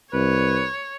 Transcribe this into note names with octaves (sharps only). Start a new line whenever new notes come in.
C2 B4 C#5